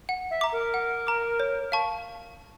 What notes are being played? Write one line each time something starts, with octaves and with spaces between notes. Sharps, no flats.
F#5
E5
A#5 D6
A#4
F#5
A#5 D6
C#5
F5 A5 C#6